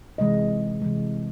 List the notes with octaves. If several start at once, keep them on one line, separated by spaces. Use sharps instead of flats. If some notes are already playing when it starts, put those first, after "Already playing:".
C3 E3 G#3 D#5
C3 E3 G#3